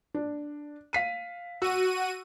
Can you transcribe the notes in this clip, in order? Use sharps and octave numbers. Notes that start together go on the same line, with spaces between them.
D4
F5 B6 D#7
F#4 E6 D#7